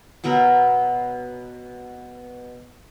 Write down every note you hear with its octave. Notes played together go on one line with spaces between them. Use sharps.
B2 F#3 B3 A#4